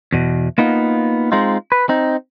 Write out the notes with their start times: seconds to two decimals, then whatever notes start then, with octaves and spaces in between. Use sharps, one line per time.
0.12 E2 B2
0.58 A#3 B3 D#4 F4
1.32 G#3 C4 D#4 F4
1.72 B4
1.89 C4 D#4